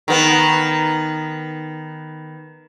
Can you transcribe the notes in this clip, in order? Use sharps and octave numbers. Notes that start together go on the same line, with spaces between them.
D#3 B3